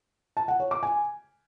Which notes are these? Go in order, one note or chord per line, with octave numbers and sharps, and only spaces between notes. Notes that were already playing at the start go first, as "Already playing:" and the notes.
A5
F#5
C#5
D6
G#5